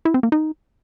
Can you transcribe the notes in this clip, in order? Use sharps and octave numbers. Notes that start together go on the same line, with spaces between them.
E4
C4
A#3
D#4